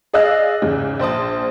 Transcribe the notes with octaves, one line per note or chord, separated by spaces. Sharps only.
G#4 D5 D#5 F5 E6 F#6
E2 G#2 C#3
A#1 C5 A5 D#6